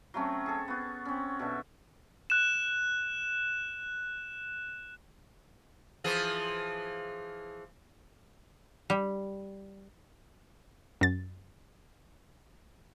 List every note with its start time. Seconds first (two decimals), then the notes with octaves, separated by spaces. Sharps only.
0.14 F#3 A3 C4 C#4
0.46 G#4 A4
0.68 B3 F#4
1.05 C4 C#4
1.39 B2 D3 E5
2.30 F#6 E7
6.04 E3 F3 G#4
8.90 G3
11.01 F#2 A6